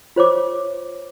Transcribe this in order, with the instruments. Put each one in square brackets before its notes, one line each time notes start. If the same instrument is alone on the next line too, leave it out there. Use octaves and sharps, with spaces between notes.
[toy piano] F4 C5 C#5 D6